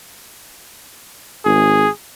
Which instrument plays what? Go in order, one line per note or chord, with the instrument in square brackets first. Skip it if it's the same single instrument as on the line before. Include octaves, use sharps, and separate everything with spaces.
[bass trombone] G#1 [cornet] G#4